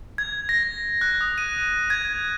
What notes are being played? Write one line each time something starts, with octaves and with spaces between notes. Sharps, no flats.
G#6
A#6
F#6
D#6
D#7
G#6